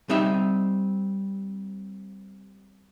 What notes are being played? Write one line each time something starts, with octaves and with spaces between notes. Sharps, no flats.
G3 C4 D#4 E5